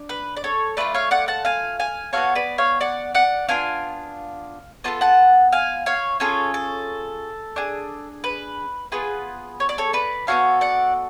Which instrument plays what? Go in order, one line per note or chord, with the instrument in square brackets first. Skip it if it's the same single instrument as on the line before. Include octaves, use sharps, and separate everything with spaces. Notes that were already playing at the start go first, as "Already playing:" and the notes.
Already playing: [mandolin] D4
B4
D5
A4 C#5
A3 D4 F4 B4 D5
C#5 F5
D5 F#5
F#5 A5
F5 G#5
F5 G#5
B3 F#4 A4 C#5 F5
B4 D5
C#5 F5
D5 F#5
D5 F#5
B3 D4 F4 F5 G#5
B3 F4 A4 A5
F#5 A5
F5 G#5
C#5 F5
C#4 F4 G#4 A4 C#5
A4
D4 G#4
B4
B3 F4 G#4 B4
C#5
D5
A4 C#5
B4 D5
B3 D4 F#4 A4 C#5 F5
D5 F#5